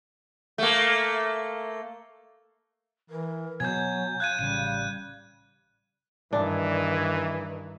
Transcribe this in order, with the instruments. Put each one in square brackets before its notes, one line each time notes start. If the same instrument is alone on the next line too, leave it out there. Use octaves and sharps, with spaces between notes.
[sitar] A3 A#3
[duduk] E3 [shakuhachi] A#4
[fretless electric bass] B2 [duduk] F#3 [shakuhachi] G#5 [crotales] G6 G#6
[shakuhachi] F5 [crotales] F#6 G#6 D#7
[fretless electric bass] A1 C#3 [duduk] G3 [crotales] D#7
[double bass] G2 D#3 [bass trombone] E3 [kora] D4